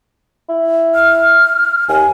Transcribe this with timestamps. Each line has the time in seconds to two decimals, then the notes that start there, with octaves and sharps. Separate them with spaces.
0.49 E4
0.95 F6
1.88 D#2 G#5